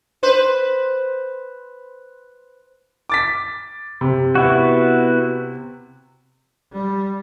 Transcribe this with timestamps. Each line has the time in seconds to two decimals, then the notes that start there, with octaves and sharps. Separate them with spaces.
0.23 B4 C5
3.10 D6 A6 B6
4.01 C3
4.35 B3 E4 F#4
6.72 G3